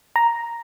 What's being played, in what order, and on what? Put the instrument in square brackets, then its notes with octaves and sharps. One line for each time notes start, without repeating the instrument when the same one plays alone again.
[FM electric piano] A#5